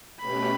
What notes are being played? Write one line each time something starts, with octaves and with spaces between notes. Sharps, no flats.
B2 A3 C#4 G4 B4 B5